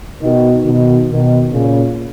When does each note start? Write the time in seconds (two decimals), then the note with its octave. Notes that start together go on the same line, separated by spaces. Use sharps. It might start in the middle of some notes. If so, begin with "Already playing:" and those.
0.22 B2 D#3
0.65 B2 D#3
1.08 B2 D#3
1.51 A#2 C#3